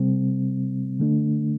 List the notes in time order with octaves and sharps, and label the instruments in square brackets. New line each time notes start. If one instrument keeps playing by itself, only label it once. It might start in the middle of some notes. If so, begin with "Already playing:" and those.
Already playing: [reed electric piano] C3 G3 C4
D3 A3 D4